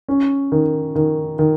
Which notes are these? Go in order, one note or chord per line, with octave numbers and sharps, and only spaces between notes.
C#4
D#3
D#3
D#3